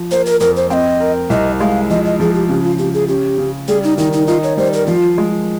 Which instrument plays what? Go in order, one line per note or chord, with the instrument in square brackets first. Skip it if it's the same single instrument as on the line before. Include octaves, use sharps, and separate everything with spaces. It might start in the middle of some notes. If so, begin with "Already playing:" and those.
Already playing: [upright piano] F3
[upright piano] A#3 [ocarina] C5
[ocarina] A#4
[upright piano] F2 [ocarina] A#4
[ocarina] C5
[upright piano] C4 [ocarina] D#5 F5
[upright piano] A#4
[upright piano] C2 [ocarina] D#5
[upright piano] G#3 [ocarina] F5
[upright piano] F3 [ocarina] D#5
[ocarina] D#5
[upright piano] F3 [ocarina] G#4
[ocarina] G4
[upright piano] C#3 [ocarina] G4
[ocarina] F4
[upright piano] C#3 [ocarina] G4
[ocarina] G#4
[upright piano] C#4 [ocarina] G4
[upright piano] C#3
[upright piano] G3 [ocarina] G#4
[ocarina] D#4
[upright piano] D#3 [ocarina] D#4
[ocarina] D#4
[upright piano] D#4 [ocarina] F4
[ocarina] C#5
[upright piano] G3 [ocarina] C5
[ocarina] A#4
[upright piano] F3 [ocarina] F4
[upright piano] G#3